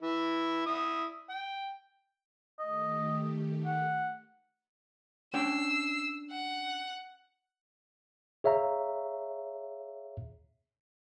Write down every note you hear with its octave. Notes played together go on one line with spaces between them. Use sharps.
E3 E4
E4 D#6
G5
D#3 A3 G4 D#5
F#5
C#4 D4 G5 E6 C7
F#5
G#4 C#5 E5 F5 A#5